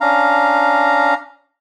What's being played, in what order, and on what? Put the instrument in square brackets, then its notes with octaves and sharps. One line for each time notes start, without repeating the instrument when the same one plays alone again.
[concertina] C#4 D4 F5 A#5